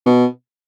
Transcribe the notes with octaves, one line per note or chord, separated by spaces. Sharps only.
B2